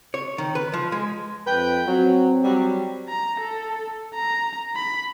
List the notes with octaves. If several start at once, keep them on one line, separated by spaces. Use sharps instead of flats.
C#5
D#3
B4
F3
G#3
F2 B4 G5
F#3 C4
F#3 G3
A#5
A4
A#5
B5